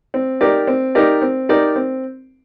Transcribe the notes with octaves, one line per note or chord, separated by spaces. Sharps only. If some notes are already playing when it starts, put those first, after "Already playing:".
C4
D#4 G4 A#4 D5
C4
D#4 G4 A#4 D5
C4
D#4 G4 A#4 D5
C4